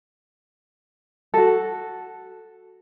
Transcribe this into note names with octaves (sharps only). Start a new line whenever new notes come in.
F#4 A4